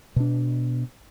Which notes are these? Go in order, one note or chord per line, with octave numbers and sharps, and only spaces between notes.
B2 D4